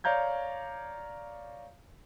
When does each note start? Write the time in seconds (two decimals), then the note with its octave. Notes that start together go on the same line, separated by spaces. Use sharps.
0.04 C#5 D5 F5 A#5 G6 G#6